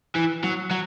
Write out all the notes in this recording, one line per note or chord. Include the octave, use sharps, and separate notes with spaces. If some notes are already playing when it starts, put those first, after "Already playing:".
E3
F#3
F#3